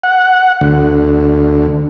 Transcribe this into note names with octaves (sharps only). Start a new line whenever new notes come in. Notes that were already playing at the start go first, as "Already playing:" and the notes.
F#5
D2